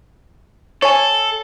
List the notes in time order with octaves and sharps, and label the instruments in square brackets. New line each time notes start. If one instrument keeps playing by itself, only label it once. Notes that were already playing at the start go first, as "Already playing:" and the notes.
[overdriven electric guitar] A4 [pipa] C#5 G#5